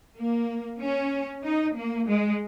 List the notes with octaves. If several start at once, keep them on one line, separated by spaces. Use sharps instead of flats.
A#3
C#4
D#4
A#3
G#3